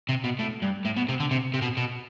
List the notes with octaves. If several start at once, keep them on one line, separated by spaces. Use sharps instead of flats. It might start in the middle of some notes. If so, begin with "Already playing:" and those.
C3
B2
A2
G2
A2
B2
C3
D3
C3
C3
B2
B2